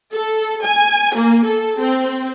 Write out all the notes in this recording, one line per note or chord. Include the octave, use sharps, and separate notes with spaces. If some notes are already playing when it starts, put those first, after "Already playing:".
A4
G#5
A#3
A4
C4